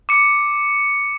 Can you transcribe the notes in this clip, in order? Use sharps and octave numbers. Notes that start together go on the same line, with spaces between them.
D6 C#7